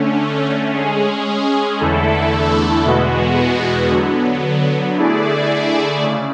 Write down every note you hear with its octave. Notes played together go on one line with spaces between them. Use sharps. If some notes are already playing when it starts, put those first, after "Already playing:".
Already playing: D3 A3 C#4
G#3 C#4 G#4
E2 D3 A3 E4 A4
E2 B2 G#3 B3 F#4
D3 F#3 B3
D3 A3 E4 G#4 D5
C#3